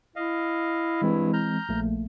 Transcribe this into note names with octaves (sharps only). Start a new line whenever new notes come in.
E4 D#5 F5
G2 E3 G#3 C4
A#5 F6 G6
A#1 A3 A#3